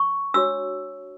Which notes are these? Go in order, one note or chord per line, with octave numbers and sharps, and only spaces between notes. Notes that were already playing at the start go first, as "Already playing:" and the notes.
Already playing: C#6
D4 F#4 C#5 E6